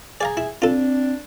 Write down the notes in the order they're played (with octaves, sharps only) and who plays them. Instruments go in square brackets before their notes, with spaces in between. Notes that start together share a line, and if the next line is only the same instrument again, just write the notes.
[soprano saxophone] G#4 [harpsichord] D5 F5 A#5
[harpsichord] E4
[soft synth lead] C4 [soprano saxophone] D4 [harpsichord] F4 A4